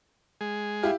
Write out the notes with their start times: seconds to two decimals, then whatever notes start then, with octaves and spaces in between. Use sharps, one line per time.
0.41 G#3 G#4
0.83 E4 G4 F5